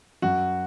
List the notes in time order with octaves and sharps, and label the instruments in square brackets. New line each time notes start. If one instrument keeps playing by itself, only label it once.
[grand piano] F#2 F#4